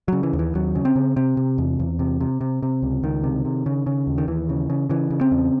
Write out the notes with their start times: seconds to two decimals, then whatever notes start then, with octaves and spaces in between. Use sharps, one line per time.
0.08 C#3 F#3
0.23 E3
0.33 D#2
0.39 E3
0.55 D#2 F#3
0.75 C#3
0.85 C4
0.96 C#3
1.16 C3 C4
1.37 C3
1.58 E2
1.79 E2
1.99 C3
2.21 C3
2.41 C3
2.63 C3
2.82 C#2
3.03 C#2 D#3
3.24 C3
3.45 C3
3.66 C#3
3.86 C#3
4.07 D#2
4.18 D#3
4.28 D#2 E3
4.49 C#3
4.70 C#3
4.89 C#3 E3
5.10 C#3
5.21 C4
5.31 E2